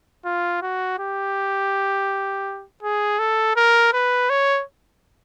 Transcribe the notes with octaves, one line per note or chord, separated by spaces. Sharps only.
F4
F#4
G4
G#4
A4
A#4
B4
C#5